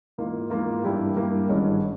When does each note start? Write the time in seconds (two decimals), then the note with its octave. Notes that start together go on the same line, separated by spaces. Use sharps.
0.18 G#2 E3 A#3 F4
0.50 G#2 E3 A#3 F4
0.83 G2 G3 A#3 E4 G4
1.16 G2 G3 A#3 E4 G4
1.49 G#1 G2 E3 G#3 C#4